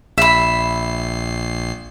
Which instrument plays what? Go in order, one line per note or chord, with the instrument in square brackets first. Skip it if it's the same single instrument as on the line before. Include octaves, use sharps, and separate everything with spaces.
[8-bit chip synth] A#1 C7 [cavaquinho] E5 B5